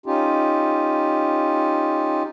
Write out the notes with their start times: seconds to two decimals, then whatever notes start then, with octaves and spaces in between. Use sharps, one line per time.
0.06 C#4 D#4 F4 G4